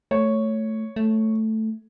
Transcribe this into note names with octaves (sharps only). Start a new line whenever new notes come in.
A3 C#5
A3